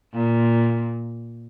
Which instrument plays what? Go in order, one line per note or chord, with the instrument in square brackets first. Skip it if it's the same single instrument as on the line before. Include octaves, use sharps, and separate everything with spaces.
[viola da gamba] A#2